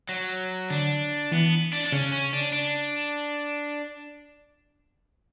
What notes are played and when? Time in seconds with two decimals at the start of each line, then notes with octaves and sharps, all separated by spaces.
0.09 F#3
0.70 D3 D4
1.32 E3 B3
1.73 D4
1.86 D4
1.92 C#3 C#4
2.13 C#4
2.34 D4
2.53 D4